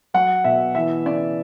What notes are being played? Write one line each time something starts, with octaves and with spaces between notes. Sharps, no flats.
F#3 F#5
B2 E5
E3 E5
C#3 D5